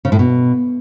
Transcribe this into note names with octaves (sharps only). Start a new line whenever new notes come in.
C#3
A2
B2